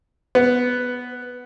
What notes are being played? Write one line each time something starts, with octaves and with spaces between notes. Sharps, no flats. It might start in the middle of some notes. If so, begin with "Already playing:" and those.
B3